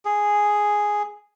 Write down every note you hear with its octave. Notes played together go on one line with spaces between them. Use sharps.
G#4